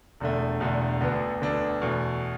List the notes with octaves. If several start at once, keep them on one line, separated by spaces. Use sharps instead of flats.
E1 E2 D3 A3
E1 E2 D3 A3
D2 D3 B3 D4
D2 D3 B3 D4
E2 B2 A3